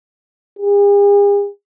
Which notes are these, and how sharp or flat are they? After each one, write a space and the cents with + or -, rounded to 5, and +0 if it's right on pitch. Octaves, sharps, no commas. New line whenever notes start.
G#4 -45